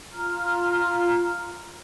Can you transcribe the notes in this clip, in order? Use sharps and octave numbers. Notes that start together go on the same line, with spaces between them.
F4 A#5 F6